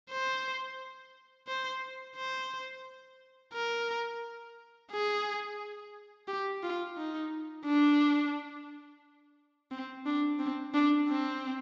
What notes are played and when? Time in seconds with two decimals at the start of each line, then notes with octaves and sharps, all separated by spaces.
0.11 C5
1.48 C5
2.16 C5
3.54 A#4
4.92 G#4
6.28 G4
6.63 F4
6.97 D#4
7.65 D4
9.71 C4
10.06 D4
10.39 C4
10.74 D4
11.09 C4